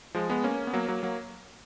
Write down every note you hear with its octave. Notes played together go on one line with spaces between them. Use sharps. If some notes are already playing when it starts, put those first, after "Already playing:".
F3 G#3
G#3 B3
A#3 C#4
B3
F#3 A#3
F#3 A#3
F#3 A#3